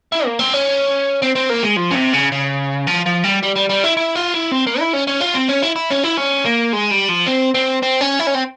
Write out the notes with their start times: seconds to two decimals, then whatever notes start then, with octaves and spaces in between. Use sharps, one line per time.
0.12 E4
0.25 A#3
0.39 C4
0.54 C#4
1.23 C4
1.36 C4
1.50 A#3
1.64 G#3
1.77 F3
1.91 C#3
1.95 C3
2.13 C#3
2.32 C#3
2.87 F3
3.06 F3
3.24 G3
3.43 G3
3.55 G3
3.69 G3
3.84 E4
3.97 E4
4.16 F4
4.34 E4
4.52 C4
4.67 A#3
4.80 E4
4.93 C#4
5.08 C#4
5.21 F4
5.35 C4
5.49 C#4
5.63 E4
5.76 E4
5.90 C#4
6.03 E4
6.17 C#4
6.45 A#3
6.73 G#3
6.91 G3
7.09 F3
7.28 C4
7.55 C4
7.82 C4
8.01 C#4
8.20 E4
8.27 C#4
8.35 C4